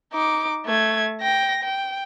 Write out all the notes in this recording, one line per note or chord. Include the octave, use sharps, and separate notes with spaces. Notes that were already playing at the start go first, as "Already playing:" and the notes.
D#4 D6
A3 G#6
G5 A#6
G5